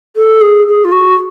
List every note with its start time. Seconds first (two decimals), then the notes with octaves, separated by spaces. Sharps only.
0.16 A4
0.41 G#4
0.67 G#4
0.85 F4
0.92 F#4